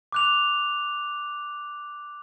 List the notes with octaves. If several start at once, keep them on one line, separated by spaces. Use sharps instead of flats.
D6 F#6 F7